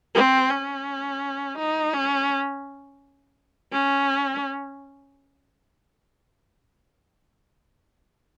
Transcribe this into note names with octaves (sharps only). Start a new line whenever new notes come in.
C4
C#4
D#4
C#4
C#4